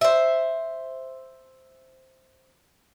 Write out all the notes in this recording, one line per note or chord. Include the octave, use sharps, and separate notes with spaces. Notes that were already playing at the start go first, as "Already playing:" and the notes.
C5 E5